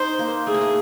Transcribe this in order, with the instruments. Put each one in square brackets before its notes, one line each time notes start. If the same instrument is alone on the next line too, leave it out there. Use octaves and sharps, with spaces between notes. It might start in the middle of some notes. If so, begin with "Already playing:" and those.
Already playing: [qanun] D#4 [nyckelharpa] C5
[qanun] A#3
[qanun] A3 [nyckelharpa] G#4
[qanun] A#3
A3